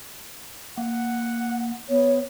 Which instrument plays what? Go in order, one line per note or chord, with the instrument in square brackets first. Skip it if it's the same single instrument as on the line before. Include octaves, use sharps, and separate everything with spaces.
[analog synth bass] A#3 [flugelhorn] F#5
[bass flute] B3 [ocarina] C#5